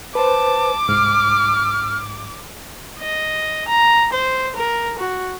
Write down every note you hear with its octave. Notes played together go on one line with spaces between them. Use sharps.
B4 C5 A5 D6
C2 G#2 F6
D#5
A#5
C5
A#4
F#4